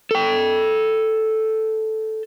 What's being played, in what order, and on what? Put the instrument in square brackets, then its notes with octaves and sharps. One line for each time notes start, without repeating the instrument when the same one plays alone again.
[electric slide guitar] A4 G5